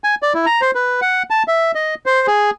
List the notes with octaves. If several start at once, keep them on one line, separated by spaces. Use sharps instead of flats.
G#5
D5
E4
A#5
C5
B4
F#5
A5
E5
D#5
C5
G#4